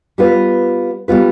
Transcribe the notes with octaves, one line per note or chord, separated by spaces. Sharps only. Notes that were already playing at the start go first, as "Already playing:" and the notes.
G3 B3 F4 B4
G3 B3 F4 B4